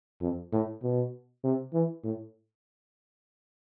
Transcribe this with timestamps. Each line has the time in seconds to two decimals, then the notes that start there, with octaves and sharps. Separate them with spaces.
0.21 F2
0.52 A2
0.83 B2
1.44 C3
1.73 E3
2.04 A2